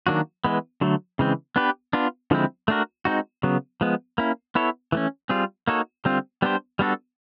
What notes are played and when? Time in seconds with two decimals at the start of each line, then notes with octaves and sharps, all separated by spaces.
0.07 D#3 F#3 A#3 D4 F#4
0.45 E3 G#3 B3
0.81 D3 F#3 A3
1.19 C#3 E3 G#3 C4
1.56 B3 D4 G4 B4
1.93 B3 D4 F4
2.31 D3 F3 G#3 C4 E4
2.68 A3 D4 F#4 A#4
3.05 G#3 C4 D#4 F#4
3.43 C#3 F#3 B3
3.81 F3 G#3 B3
4.18 A#3 C#4 E4
4.55 B3 E4 A4 C#5
4.92 E3 A3 C#4
5.29 G3 C4 F4 G#4
5.67 A#3 D#4 F#4 A4 C#5
6.05 D3 G3 C4 F4
6.42 G3 B3 D4 G4 C5
6.79 G3 B3 D4 F#4 A4